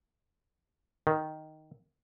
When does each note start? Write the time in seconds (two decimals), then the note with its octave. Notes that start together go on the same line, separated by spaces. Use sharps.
1.07 D#3